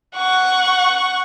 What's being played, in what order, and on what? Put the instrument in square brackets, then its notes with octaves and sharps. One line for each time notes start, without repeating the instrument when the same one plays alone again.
[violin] F#5 C#6